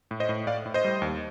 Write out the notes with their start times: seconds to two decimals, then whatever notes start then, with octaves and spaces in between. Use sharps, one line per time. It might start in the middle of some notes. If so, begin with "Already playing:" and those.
0.11 A2
0.20 C5 D#5
0.29 A2
0.47 A2 D5 F5
0.66 A2
0.74 C5 D#5
0.85 G3
1.02 D#2